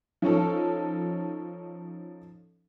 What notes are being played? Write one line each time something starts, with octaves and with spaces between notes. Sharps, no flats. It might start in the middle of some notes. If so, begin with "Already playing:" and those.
F3 C#4 D#4 A4